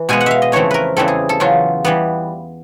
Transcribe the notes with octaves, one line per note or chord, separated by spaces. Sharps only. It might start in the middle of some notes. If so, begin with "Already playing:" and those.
Already playing: E3
B2 G#3 B3 G#5
F#5
E5 F5
D#5
F2 C#3 E3 A3 C4 C#5
A#4 B4
E2 C#3 E3 G3 C4 A4
G#4
A4
E2 C#3 F#3 F4
E3 G3 B3